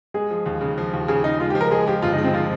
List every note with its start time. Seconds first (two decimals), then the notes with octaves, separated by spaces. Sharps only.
0.14 G#3 G#4
0.31 F3
0.46 D#2
0.61 C#3
0.78 F3
0.93 D#2
1.08 C#3 G#4
1.24 C#3 D#4
1.40 G#3 F4
1.50 G4
1.55 F3
1.61 A#4
1.71 G#3 G#4
1.87 F3 G4
2.02 G1 F4
2.13 D#4
2.18 G#3
2.24 C4
2.34 F3 F4